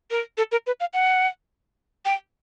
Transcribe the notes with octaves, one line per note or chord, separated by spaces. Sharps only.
A#4
A4
A#4
B4
F5
F#5
G5